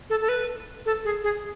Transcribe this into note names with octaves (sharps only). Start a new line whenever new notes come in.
A4
A4
B4
A4
G#4
G#4